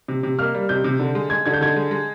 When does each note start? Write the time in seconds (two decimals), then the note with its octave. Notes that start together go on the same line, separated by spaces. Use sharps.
0.08 C3
0.23 C3
0.39 A#3 F6
0.54 G3
0.69 C3 G6
0.84 C3
0.99 D3
1.15 G#3
1.30 G#3 G#6
1.46 D3 G#6
1.54 G6
1.61 D3 G#6
1.76 G#3
1.91 G#3